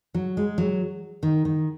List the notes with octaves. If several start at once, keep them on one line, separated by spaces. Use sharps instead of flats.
F#3
G#3
F#3
D#3
D#3